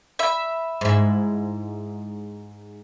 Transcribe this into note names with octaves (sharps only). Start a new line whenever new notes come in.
E5 B5
G#2 E4